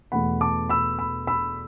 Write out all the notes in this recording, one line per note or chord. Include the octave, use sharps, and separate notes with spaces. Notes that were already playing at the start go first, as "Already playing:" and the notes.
E2 B2 A3 F#5 B5
A5 D6
B5 E6
B5 E6
B5 E6